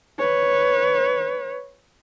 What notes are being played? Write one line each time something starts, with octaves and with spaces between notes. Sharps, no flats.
B4 C#5